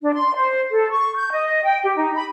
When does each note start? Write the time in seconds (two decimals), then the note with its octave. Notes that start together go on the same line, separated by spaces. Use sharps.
0.01 D4
0.13 C6
0.35 C5
0.71 A4
0.91 C#6
1.17 G6
1.32 D#5
1.64 G5
1.83 G4
1.96 D#4
2.14 B5